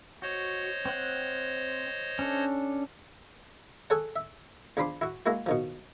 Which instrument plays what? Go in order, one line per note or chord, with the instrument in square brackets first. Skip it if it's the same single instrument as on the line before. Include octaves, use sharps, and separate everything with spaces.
[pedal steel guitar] F#4 [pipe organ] C5 C#5 D#5
[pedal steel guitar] C4 F#5
C#4 D4 A4
[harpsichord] G#4 A4 C#5 F#5
E5
E2 F3 D4 B5 C6 D6
E4 F#4
G#3 A#3 E4 F#4
B2 D#3 F3